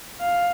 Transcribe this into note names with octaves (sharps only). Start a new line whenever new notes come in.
F5